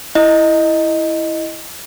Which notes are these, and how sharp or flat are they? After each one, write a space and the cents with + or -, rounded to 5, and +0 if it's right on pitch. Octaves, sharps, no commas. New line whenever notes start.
E4 +0 D#5 +0